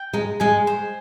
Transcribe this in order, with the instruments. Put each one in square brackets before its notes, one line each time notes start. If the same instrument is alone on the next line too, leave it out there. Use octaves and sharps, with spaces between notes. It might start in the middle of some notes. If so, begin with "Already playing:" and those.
Already playing: [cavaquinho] G5
[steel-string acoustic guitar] G#3 [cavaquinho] A#5
[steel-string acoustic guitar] G#3 [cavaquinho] G#4
[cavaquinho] C5